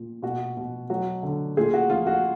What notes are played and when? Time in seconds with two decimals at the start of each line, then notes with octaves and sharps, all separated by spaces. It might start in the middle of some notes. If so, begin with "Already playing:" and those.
Already playing: A#2
0.22 B2 F#4
0.57 B2
0.90 F#3 F#4
1.23 D3
1.57 A#2 G#4
1.74 F#4
1.90 F3 F4
2.07 F#4